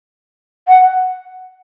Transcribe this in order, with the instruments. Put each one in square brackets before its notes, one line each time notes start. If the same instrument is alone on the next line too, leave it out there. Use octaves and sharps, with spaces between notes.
[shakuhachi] F#5